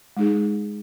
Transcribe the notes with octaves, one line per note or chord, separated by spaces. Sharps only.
G#3 D#4 G#4